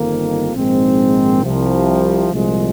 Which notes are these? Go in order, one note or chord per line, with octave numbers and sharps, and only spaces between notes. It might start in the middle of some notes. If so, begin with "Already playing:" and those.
Already playing: G1 F2 D#3 A#3
A#1 G#2 D#3 G#3 C4
C2 C3 F3
C2 A#2 F3 G#3